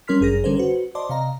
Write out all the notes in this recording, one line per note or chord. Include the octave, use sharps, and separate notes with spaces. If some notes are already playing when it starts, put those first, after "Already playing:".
G3 C#4 A#4 C6 F6 B6
G1 F#2 G#4 A#4 A#6
D3 G3 C#4 A4 A#4 C5
F#4 B4 C5
C5 D5 D#5 A5 C6 D6
C3 D#5 F5 A#5